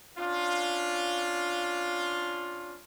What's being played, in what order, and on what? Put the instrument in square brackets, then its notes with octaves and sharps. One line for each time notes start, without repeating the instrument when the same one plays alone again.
[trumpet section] C#4 D4 F4